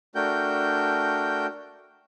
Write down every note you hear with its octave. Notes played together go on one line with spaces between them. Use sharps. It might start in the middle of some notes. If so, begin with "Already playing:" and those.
A3 D4 F#4 A#4 G5 G6